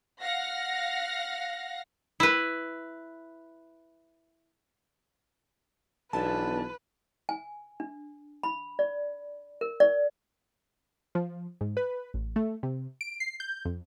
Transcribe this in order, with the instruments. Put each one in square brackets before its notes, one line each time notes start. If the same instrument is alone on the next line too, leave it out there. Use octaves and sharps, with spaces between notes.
[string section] F5 F#5 A#6
[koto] E4 B4
[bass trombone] B1 [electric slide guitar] E3 B3 D4 [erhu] B4 [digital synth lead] A5
[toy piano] G#5
D4
B5
D5
A#4
D5
[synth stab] F3
G#2
B4
A1
A3
C3
D7
C7
G6
F2